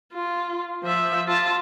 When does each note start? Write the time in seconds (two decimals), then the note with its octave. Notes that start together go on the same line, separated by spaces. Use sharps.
0.13 F4
0.83 F3 E5
1.27 F4 A5